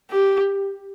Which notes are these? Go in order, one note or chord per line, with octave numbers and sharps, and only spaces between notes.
G4